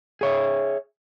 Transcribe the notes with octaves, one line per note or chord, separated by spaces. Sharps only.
G#4 C#5 E5